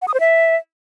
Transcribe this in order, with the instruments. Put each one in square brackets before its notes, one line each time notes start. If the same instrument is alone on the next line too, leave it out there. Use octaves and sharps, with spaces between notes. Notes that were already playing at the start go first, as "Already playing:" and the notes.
[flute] F#5
D#6
C5
E5